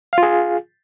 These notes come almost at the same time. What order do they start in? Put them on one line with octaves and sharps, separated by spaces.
F5 F4 G#4